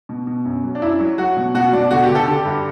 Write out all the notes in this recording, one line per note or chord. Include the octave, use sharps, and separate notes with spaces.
B2
B2
F#2
F#3
D4
F#2 E4
F#3
F#3 F#4
B2
B2 F#4
B2 D4
D3 F#4
G4
D3
A4
D3 G4
G2